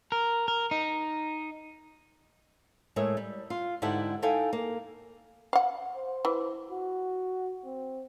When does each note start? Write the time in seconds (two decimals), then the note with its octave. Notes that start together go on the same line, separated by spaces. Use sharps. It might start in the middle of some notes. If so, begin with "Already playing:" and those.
0.12 A#4
0.48 A#4
0.71 D#4
2.96 A2 G#3 A3 A#4 E5
3.17 G3
3.50 F4
3.82 G#2 D3 E4 G4 F#5 A5
4.22 D#4 E4 A4 F5 G5 G#5
4.53 A#3
5.53 F5 F#5
5.96 C5
6.25 E3
6.71 F#4
7.64 C4